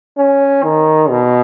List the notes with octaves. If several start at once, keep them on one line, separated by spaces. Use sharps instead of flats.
C#4
D#3
B2